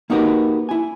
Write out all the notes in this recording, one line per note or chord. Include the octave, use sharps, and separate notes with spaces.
A#3 D#4 F#4 G4 A#4 B4
E4 G#5